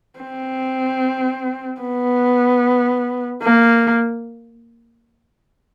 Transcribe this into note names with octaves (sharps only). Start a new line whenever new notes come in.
C4
B3
A#3